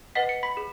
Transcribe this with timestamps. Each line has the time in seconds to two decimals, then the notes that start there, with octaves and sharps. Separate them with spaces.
0.15 B4 D#5 F#5 B6
0.29 C#7
0.43 B5 B6
0.57 G#4